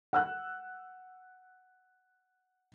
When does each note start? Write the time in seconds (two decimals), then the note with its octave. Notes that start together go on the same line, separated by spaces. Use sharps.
0.13 F#5 E6 F#6